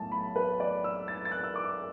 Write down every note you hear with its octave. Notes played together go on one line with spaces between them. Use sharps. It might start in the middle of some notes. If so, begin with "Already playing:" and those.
Already playing: B1 A2 A3 A5
B5
B4
D5
E6
A6
A6
F#6
E6
D6